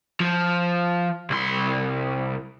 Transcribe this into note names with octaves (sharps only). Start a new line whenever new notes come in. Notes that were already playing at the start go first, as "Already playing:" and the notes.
F3
C2 C6